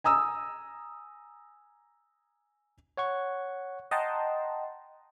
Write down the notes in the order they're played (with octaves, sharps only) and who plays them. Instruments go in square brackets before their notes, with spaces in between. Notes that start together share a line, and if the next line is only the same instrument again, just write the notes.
[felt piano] G#5 A#5 D#6 E6
[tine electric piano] C#5 F#5 C#6
[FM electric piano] D#5 F#5 G5 A5 A#5 C6